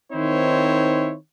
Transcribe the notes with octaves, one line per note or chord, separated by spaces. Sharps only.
D#3 C4 D#4 E4 C5 C#5